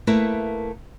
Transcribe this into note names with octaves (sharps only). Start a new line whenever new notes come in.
A3 A#3 E4 A#4 B4